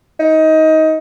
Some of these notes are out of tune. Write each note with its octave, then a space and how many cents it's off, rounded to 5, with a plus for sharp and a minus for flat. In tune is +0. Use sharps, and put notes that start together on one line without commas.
D#4 +20